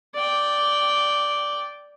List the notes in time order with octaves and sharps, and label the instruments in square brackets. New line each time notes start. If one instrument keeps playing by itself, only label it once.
[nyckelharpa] D5 G5